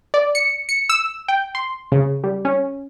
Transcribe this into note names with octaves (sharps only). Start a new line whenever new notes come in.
D5
C#7
C#7
E6
G5
C6
C#3
G3
C#4